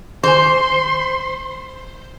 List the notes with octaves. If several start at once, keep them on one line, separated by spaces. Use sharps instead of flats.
D#3 C5 G#5 C6